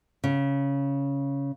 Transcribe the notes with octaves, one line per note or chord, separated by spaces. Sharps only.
C#3